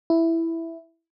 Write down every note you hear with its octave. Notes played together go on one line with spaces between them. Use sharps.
E4